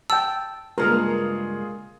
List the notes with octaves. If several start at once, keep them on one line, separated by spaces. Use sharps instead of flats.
G5 A5 E6
G2 C#3 G#3 A#3 F4 G#4 A#4